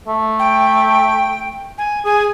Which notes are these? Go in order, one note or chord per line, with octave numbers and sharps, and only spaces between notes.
A3
G5
G#5
G#4 G#5